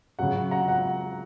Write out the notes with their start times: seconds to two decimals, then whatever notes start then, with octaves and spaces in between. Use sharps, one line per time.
0.19 C#3 F#3 F#5
0.51 F#5 A#5
0.68 F#5